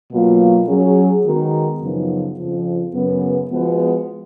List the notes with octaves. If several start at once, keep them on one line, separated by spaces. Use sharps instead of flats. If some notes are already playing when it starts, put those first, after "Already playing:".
B2 F#3 A#3 F4
F#3 C#4 G#4
D#3 G#3 B3 F#4 A#4
F#2 C#3 F3 B3 D#4
F2 C#3 F3
F#2 C#3 F#3 B3
F3 G#3 B3 F#4